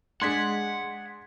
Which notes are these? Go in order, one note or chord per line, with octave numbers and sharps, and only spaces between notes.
G#3 D4 G#4 F#5 C6 G#6 B6